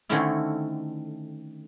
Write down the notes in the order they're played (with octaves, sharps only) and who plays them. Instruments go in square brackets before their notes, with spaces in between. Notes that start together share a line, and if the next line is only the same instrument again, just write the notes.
[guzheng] D3 D#3 A3 C4 C#4 E4